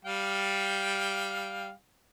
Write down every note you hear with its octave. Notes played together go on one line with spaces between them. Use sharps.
G3 F5 G5